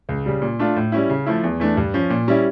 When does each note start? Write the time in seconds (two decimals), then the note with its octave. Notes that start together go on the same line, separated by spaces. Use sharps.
0.09 C#2
0.26 C#3 G3
0.42 A#2
0.59 A3 D4 F4
0.76 A2
0.92 G3 C#4 E4
1.10 C#3
1.26 F3 A3 E4
1.44 E2
1.60 E3 A3 D4
1.77 G2
1.94 F3 C#4
2.10 A#2
2.28 G3 C#4 E4